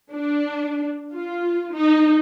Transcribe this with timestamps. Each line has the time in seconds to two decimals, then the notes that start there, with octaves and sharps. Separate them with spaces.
0.12 D4
1.13 F4
1.74 D#4